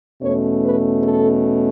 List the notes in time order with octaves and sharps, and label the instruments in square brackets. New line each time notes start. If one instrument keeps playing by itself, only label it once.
[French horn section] E2 B2 A3 C#4 C#5
B4
A4